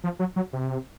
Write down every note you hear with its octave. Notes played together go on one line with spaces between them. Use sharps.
F3
F#3
F#3
C3